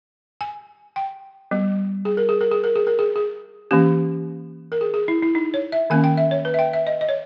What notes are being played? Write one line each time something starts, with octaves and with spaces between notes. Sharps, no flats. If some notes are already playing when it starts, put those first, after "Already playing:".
G#5
G5
G3 B3
G#4
A#4
G#4
A#4
G#4
A#4
G#4
A#4
G#4
G#4
E3 A#3 C#4 G4
A#4
G#4
G#4
E4
E4
D#4
C#5
E5
D#3 A#3 C#4 G#5
G5
E5
C#5
B4
E5
G5
E5
D#5
D#5
C#5